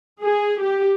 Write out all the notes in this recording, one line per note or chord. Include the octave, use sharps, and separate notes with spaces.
G#4
G4